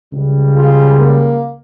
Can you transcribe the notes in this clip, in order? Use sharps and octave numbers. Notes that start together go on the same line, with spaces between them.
C#2 C#3 G3
F4 G#4
A#3